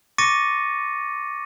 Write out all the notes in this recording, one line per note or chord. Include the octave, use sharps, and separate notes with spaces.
C#6 D6 A6 A#6 C#7 D#7